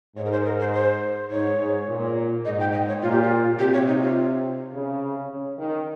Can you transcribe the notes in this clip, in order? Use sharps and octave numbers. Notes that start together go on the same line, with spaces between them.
G#2 C#5
A#4
C5
A#4
C5
C5
G#2 C#5
G#2
A#2
G#2 D#5
G5
D#5
C#5
A#2 F4
G4
F4
C3 G4
C#5
D#4
F4
C#3
C#3
D#3